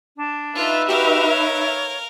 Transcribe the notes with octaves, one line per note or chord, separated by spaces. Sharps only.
D4
D#4 F4 B4 E5
F#4 G4 A#4 F5 B5
C#5